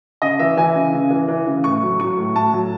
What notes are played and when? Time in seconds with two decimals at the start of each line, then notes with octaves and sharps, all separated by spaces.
0.22 C#3 D#5
0.39 E3 E5
0.57 E3 G#5
0.75 C#3
0.93 C#3
1.11 E3
1.28 E3
1.46 C#3
1.64 A2 C#6
1.82 F#3
2.00 F#3 C#6
2.17 A2
2.36 A2 A5
2.53 F#3